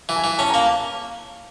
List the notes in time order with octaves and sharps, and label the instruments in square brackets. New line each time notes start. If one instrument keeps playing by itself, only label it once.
[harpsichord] E3
[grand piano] G#5
[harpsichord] E3
[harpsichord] C#4 [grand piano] A5
[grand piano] A#5
[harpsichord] A#3
[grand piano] A5